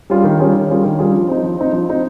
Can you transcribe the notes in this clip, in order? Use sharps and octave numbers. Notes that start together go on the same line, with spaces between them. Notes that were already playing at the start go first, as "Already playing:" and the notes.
G3 C#4 F4 G#4
D#3
G3 C#4 F4 G#4
D#3
G3 C#4 F4 G#4
D#3
G3 C#4 F4 G#4
F3
C4 D#4
F3
C4 D#4
F3
C4 D#4